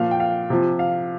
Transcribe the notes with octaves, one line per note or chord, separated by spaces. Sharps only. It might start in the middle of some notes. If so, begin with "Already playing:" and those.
Already playing: A#2 F3 F5
G5
F5
C3 F3
F5